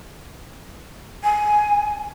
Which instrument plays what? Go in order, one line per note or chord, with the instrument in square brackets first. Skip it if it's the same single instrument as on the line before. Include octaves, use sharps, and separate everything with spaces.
[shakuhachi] G#5